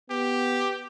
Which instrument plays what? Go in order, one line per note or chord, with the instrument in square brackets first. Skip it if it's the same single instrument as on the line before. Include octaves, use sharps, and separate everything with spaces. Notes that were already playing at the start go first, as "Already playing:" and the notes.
[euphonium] B3 [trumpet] G4